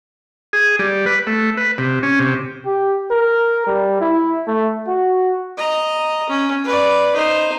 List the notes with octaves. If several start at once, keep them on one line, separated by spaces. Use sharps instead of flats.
G#4
G3
B4
A3
B4
C3
C#4
C3
G4
A#4
G3
E4
A3
F#4
D#5 A#5
C#4
B4 D5
D#4 C5